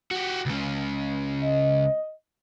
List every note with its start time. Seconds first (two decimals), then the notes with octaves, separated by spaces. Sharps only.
0.11 F#4 G4
0.46 C#2 C#3
1.43 D#5